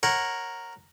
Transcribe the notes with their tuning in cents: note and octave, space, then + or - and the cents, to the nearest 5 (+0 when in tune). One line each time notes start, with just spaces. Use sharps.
A#4 +0 C#5 -15 F#5 +0